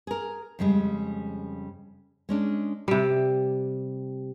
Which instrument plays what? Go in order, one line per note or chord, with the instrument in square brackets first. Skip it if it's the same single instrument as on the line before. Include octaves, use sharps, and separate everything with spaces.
[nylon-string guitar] G#4 A#4
F2 C#3 G3 G#3
G#3 C#4 D4
[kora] C3 G3